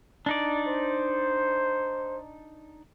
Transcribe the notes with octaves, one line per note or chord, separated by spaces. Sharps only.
D4 D#4 D5
C5